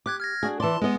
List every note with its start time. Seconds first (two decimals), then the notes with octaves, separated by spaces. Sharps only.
0.06 G4 D6 F#6 G#6
0.20 F6 G#6 A#6
0.43 D4 F#4 G#4
0.60 E3 D5 A5 C6
0.82 G#3 B3 G#4 D#5